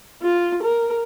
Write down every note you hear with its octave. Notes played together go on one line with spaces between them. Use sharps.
F4
A#4